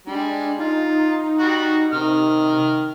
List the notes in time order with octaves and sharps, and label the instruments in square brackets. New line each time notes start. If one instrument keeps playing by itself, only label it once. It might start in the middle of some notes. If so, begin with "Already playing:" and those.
[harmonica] G3 G#3 [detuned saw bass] D4
[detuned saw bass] D#4 [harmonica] F4
[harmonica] G3 F#4 F#5
[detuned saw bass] C3 [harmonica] D#3 F6